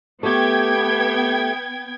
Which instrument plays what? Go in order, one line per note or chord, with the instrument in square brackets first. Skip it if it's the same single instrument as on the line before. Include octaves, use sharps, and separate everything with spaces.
[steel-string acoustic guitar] A3 G4 [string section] B3 G5 G#6